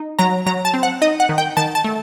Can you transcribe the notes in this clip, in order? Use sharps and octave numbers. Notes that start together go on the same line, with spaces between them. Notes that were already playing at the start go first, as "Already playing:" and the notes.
Already playing: D#4
F#3 A#5
F#3 A#5
A5
C4
F#5
D#4 D#5
F#5
D#3
G5
D#3 A5
A5
A3